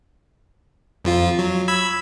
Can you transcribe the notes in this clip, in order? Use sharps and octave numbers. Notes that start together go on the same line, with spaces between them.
F2 F3 F4
F#3
B5 E6 G#6